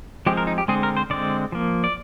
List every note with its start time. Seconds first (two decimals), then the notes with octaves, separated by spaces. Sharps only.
0.26 F3 G#3 C4 G4
0.37 A#4
0.47 D#4
0.58 G4
0.68 D3 G#3 C4 G#4
0.83 A#4
0.97 C5
1.10 D3 G#3 C4 D5
1.52 F3 A#3
1.84 D5